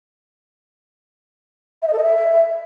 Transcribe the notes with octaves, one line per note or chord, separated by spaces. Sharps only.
E5
D#5
A4
D#5
E5